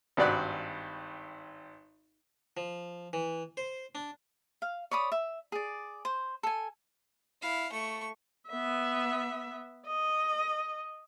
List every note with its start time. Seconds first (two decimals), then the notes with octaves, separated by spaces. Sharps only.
0.17 G#1 G2 F#4 D5 B5 F#6
2.57 F3
3.13 E3
3.57 C5
3.95 D4
4.62 F5
4.91 C#5 D5 B5 D#6
5.12 E5
5.52 G#4 D5
6.05 C5
6.43 A4 G#5
7.42 E4 F5
7.72 A3 C#6
8.50 B3 E5
9.87 D#5